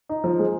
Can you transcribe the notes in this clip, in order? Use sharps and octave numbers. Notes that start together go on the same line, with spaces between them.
D#4
F3
G#3